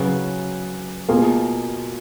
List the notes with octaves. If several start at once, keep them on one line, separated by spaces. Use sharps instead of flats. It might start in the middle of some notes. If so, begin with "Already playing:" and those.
Already playing: C#3 F#3 C#4 G#4 B4
B2 A#3 F4 G#4